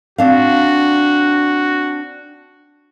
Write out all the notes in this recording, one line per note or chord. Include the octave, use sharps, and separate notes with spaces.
C4 D4 F#4 F5